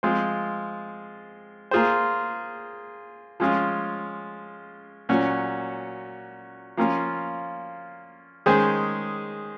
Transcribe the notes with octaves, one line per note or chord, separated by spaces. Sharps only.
F3 G#3 C4 F4 C5
A#3 F4 G#4 C5
F3 G#3 C#4 F4
A#2 F#3 C#4 F#4
F3 A#3 C#4 F4
D#3 G#3 C#4 G#4 C5